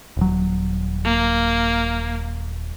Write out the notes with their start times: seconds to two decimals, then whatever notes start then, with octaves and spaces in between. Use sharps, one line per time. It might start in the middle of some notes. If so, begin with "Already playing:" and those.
0.17 D#1 F#3
1.04 A#3